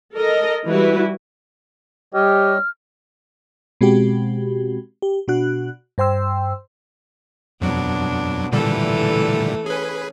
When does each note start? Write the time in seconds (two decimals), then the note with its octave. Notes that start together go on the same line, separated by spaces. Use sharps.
0.16 A4 A#4 D#5
0.67 E3 G3 E4 F#4 B4
2.14 G3 G4 C#5 D#5 F6
3.81 B2 G#3 C4 F#4 G4
5.02 G4
5.28 B2 D4 F#4 F#6
5.98 G2 C5 G5 C6 E6
7.62 F2 B2 F#3 D4
8.52 A#2 D3 E3 G3 A3 A4
9.66 C#4 G#4 B4